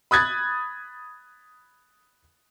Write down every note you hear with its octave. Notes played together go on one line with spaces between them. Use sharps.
B5 D#6 F#6 G#6 A6